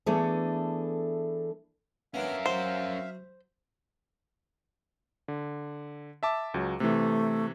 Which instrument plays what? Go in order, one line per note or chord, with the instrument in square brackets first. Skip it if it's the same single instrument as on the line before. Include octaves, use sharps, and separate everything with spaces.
[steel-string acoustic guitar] E3 A3 B3 D4 G#4 A4
[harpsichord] B3 D4 [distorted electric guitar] C#4 A#4 [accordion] E5 F5
[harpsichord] F#3 [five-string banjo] C5
[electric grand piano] D3
E5 A5 D6
C#2 F#3
[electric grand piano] C3 E3 [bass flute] A3